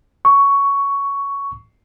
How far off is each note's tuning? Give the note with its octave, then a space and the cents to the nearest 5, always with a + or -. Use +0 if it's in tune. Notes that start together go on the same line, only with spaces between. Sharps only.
C#6 +10